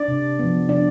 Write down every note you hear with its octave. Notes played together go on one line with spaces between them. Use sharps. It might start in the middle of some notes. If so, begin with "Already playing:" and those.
Already playing: D4 D5
C3
F3 B3
C3 D4 D5